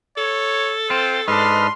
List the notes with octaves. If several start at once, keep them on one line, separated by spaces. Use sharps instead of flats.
A4 C#5
C4 F4 C5
G#2 D4 B4 D#5 C6 F6